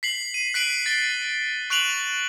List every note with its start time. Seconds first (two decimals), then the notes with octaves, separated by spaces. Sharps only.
0.03 B6 C7 F#7
0.34 D#7
0.54 F#6 B6 C7 D7 F#7
0.86 A6 D7 G7
1.70 C#6 F#6 D7 F7 F#7